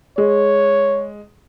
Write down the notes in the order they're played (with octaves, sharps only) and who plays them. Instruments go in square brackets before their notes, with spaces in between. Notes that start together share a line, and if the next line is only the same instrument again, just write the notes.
[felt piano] G#3 [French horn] C#5